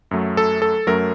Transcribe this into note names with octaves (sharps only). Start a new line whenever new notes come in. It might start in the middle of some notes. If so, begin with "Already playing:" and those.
F#2 F#3 A3
A4
A4
F#2 F#3 A3 A#4